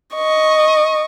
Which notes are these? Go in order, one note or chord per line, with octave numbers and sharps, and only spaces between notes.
D#5 C#6